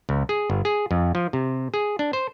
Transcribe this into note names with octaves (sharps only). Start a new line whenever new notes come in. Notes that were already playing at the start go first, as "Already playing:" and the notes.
C#2
G#4
G1
G#4
F2
F3
C3
G#4
D4
C5